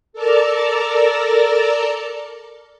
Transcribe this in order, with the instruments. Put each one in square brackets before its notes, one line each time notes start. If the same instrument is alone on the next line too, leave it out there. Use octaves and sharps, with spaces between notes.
[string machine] A4 A#4 D5 A5 A#5